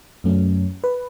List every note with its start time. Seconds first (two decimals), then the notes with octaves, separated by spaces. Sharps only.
0.24 F#2 F#3 A3 C#4
0.84 B4